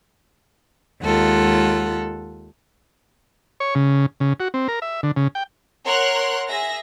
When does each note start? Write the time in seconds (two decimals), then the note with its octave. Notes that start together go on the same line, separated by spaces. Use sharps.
1.02 D#2 G#3 F4 A4 F#5
3.60 C#5
3.75 C#3
4.20 C#3
4.40 F#4
4.54 C4
4.68 A#4
4.82 E5
5.03 D3
5.16 C#3
5.35 G5
5.85 A#4 C#5 F#5 C6 F6 F#6
6.49 G#4 E5 A#6